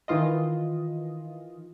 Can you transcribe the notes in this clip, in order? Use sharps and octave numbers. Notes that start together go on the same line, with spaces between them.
D#3 E3 F4 D#5